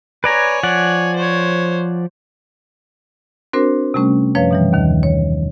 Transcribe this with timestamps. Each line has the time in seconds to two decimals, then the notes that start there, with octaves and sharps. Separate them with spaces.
0.24 B4 C#5 D5 G#5 A#5
0.63 F3 D5 F#5
1.15 C5 C#5
3.53 C4 D4 F#4 A#4 C5
3.94 C3 G3 A3 C#4
4.35 F#2 F3 B4 C#5 F5
4.51 B2 E3 G3
4.73 D#2 D#3
5.03 C#5